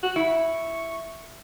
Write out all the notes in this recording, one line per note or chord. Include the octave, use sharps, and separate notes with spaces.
F#4
E4 C#6